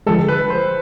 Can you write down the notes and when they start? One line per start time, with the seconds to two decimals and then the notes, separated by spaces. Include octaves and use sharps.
0.06 D3 F3 G#3 A4
0.28 B4
0.50 C5